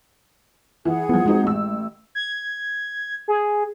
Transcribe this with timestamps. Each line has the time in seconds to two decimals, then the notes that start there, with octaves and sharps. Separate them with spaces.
0.85 E3 G#4 F#5
1.09 E3 F3 B3
1.26 G#3 C4 D#4 F#4
1.43 A1 E6
2.15 G#6
3.28 G#4